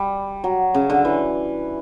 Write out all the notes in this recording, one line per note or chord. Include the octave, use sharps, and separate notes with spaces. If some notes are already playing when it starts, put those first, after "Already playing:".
Already playing: G3
F#3
C#3
D3
E3